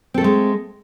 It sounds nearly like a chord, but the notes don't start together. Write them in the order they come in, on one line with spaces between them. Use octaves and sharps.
C4 A4 A3 G#3